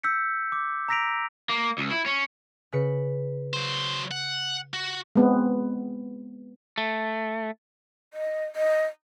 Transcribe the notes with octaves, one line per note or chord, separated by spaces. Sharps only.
E6 G6 B6 C#7
D6
A#5 E6 A#6 B6 D7 F7
A#3
C#2
E4
C#4
C#3 B4 C#7
F#3 C5
F#5
F#4
G#3 B3 C4
A3
D#5
D#5